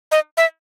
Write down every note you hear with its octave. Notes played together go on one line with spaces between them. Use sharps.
D#5
E5